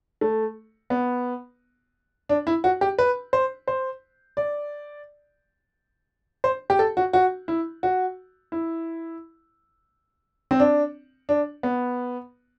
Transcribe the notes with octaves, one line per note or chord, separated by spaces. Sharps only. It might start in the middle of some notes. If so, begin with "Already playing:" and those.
A3
B3
D4
E4
F#4
G4
B4
C5
C5
D5
C5
G4
A4
F#4
F#4
E4
F#4
E4
C4
D4
D4
B3